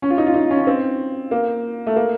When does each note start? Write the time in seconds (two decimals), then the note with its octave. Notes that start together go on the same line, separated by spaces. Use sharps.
0.02 C#4
0.10 F4
0.18 D#4
0.26 F4
0.34 D#4
0.50 C#4
0.61 C#4
0.67 C4
1.31 A#3
1.87 A3
1.96 A#3